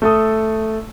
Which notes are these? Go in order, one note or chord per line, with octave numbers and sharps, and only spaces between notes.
A3 A4 D#6